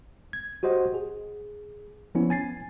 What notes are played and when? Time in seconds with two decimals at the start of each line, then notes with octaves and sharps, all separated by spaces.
0.33 G#6
0.63 F#4 G4 C5 D#5 F#5
0.94 G#4
2.15 F3 B3 C#4 E4
2.30 G#5 A6 C7